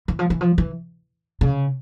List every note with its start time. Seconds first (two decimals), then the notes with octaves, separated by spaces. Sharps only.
0.08 E3
0.19 F3
0.30 E3
0.41 F3
0.58 E3
1.41 C#3